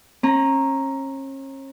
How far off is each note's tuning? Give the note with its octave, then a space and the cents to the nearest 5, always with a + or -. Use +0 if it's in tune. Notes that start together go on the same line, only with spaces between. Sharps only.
C#4 -40 A#5 +0